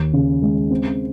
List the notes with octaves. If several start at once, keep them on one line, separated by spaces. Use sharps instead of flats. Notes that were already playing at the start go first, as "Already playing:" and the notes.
Already playing: D#2
C#3
G#3
C4